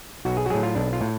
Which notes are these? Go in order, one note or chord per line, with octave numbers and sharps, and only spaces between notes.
B1 F#4
G#4
F#4
A2 F#3 G#4
F4
B1 D4
F4
A2